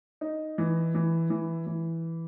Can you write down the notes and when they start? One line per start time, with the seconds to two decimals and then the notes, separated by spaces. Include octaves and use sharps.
0.21 D#4
0.58 E3
0.95 E3
1.30 E3
1.67 E3